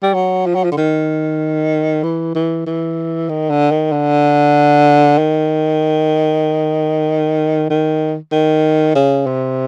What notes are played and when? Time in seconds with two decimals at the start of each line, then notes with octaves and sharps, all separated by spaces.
0.03 G3
0.14 F#3
0.46 F3
0.55 F#3
0.64 F3
0.71 D3
0.77 D#3
2.03 E3
2.35 E3
2.66 E3
3.29 D#3
3.50 D3
3.71 D#3
3.92 D3
5.18 D#3
7.70 D#3
8.32 D#3
8.95 C#3
9.26 C3